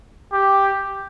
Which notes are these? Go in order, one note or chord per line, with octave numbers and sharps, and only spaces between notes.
G4